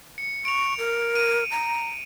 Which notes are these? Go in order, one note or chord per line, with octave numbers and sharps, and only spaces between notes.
C#7
C#6 D7 F7
A#4
D#7
A#5